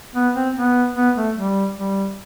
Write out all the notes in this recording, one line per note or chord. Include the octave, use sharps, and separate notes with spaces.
B3
C4
B3
B3
A3
G3
G3